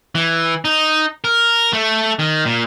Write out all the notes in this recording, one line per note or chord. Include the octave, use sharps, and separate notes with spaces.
E3
D#4
A#4
A3
D#3
A#2